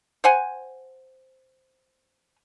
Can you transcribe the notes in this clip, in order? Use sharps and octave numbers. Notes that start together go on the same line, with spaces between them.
C5 F#5 G#5